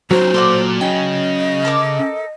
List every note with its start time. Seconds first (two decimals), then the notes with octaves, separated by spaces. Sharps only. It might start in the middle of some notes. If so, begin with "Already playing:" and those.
0.11 F#3 C#4 D#4 C5
0.34 A#2 A4 D5 F#5 C6
0.81 C#3 C#4 D#5 G5
1.65 A4 A#4 D6